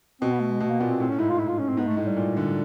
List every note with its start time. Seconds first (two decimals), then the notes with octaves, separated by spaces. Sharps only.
0.21 B2 C4
0.31 B3
0.40 A3
0.51 G#3
0.60 B2 A3
0.70 A#3
0.80 A#2 B3
0.89 C4
1.00 A2 C4
1.10 C#4
1.19 G#2 E4
1.29 F4
1.38 E4
1.48 F4
1.59 C#4
1.69 C4
1.77 G#2 B3
1.87 A3
1.97 A2 G#3
2.07 G3
2.17 A#2
2.37 D3